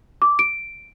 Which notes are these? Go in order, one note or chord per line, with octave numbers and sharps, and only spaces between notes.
D6
D7